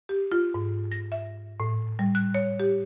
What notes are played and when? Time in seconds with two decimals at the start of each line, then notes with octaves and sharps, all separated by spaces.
0.09 G4
0.32 F4
0.54 G#2
0.92 A#6
1.12 E5
1.60 A2
1.99 G3
2.15 F#6
2.35 C#5
2.60 G4